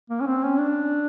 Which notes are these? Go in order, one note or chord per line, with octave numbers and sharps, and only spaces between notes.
A#3
C#4
C4
C#4
D4